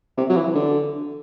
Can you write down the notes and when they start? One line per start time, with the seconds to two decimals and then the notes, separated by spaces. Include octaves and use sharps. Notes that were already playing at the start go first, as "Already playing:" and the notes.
0.17 C3
0.29 F#3
0.36 E3
0.55 D3